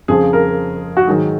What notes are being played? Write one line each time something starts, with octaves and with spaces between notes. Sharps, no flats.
F2 C#3 F3 G#4
A#4
F#4
G#2 D#3 F#3 G#4